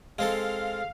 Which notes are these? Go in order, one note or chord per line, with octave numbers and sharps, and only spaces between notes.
G#3 C4 A4 F5